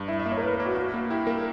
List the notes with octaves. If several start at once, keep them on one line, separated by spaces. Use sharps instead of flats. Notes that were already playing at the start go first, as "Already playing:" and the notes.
Already playing: G2
E4 E5
E5
A#3
C#5
A#4
E4 B4
B4
A#3
F#4
A#3 F#4
A#3
E4 G4
A#3 A#4